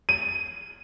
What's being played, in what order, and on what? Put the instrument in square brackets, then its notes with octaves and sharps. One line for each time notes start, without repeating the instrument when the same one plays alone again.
[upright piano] D#7